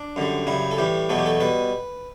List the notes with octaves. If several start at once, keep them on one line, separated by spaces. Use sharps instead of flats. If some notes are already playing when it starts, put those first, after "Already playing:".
Already playing: D4
F#2 D3 G3
F#2 C#3 G3 E4
A4
A2 E3 G3 G4
E2 B2 F#3 A3 A4
G4
A4
B2 G3 B4